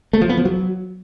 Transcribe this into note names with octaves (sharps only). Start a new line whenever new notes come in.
A3
F3
B3
F3
F#3